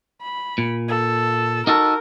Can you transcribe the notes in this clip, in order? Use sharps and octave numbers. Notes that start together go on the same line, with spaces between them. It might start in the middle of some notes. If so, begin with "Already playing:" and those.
B5
A#2
A4
D#4 F#4 A4 A#4